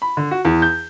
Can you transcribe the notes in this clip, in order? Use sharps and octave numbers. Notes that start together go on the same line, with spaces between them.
B5
D3
F#4
E2
G6